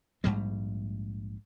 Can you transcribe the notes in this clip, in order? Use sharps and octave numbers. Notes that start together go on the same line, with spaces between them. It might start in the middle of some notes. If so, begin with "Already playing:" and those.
A#1 G#2 G3 G#3